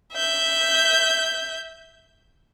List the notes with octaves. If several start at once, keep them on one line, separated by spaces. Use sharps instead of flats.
E5 G6